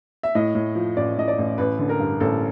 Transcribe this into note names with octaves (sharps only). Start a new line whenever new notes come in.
E5
A2 D#5
A2
F3
A1 D5
A2 D#5
D5
A1
A1 B4
D3
A#4
G2
A1 A4